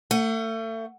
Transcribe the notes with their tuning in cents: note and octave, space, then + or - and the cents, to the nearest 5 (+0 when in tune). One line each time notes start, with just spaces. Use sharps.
A3 +35 F#5 +0